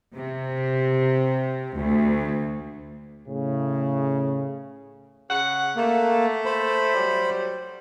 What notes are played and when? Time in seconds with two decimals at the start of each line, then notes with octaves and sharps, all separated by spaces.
0.15 C3
1.77 D2
3.29 A2 C#3
5.29 C#3 F#5
5.76 A3 A#3
6.46 C5 B5
6.94 F#3 G3